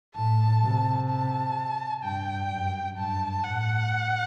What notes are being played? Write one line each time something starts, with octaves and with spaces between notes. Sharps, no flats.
A2 A5
C3
A5
G2 G5
F#2
G2 A5
A2 F#5